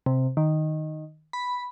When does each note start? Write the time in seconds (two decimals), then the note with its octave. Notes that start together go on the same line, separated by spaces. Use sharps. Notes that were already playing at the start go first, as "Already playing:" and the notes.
0.06 C3
0.37 D#3
1.33 B5